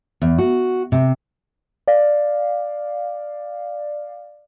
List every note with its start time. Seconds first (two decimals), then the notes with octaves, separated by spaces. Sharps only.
0.22 E2
0.38 F#4
0.92 C3
1.88 D5 F5